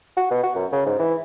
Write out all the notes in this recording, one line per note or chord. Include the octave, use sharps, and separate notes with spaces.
F#4
B2
F#4
F#2
C#3
G#2
E3